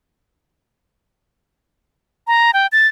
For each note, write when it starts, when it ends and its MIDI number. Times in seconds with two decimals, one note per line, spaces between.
2.27 2.51 82
2.54 2.67 79
2.72 2.87 93